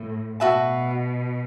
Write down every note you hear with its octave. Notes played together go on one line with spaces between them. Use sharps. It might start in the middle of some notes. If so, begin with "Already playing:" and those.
Already playing: A2
B2 F#4 B4 E5 A5